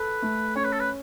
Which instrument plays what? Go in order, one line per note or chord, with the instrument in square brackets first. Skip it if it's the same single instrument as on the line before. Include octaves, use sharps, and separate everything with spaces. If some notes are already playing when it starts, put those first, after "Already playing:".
Already playing: [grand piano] A4 [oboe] B4
[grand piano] A3
[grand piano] C#4 [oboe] C#5
[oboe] B4
A4
B4